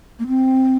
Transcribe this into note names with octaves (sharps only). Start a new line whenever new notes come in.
A#3
C4